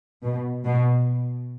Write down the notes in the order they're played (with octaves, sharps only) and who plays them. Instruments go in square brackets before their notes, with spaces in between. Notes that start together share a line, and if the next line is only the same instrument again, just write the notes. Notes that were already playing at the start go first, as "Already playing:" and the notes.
[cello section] B2
B2